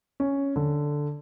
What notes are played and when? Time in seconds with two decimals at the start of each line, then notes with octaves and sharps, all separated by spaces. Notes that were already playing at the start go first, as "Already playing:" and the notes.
0.20 C#4
0.56 D3